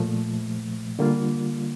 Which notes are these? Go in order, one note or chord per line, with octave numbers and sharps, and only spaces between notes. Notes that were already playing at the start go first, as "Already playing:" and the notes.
Already playing: A#2 F3 A3
D3 G3 A#3 F4